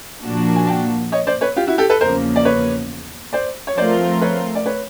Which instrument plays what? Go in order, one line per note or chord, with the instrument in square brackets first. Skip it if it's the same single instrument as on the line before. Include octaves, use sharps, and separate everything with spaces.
[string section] A#2 F3 A#3 D4 F#4
[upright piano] G#5
G5 A5
C#5 D#5
C5 D5
B4 C#5
F4 G4
E4 F#4
G4 A4
A4 B4
[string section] E2 C#3 F3 A#3 [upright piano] A#4 C5
[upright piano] D5
B4 C#5
C5 D5
C#5
[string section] F3 A3 C4 F4 A#4 [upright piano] C5 D5
[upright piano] B4 C#5
D5
B4 C#5